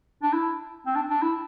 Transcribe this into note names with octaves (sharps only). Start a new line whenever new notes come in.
D4
E4
C4
D4
D4
E4